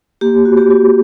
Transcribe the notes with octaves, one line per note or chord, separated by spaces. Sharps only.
A#3 G4
F#4
G4
F#4